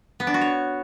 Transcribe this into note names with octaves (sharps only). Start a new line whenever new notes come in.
B3
D4
F#4
C#5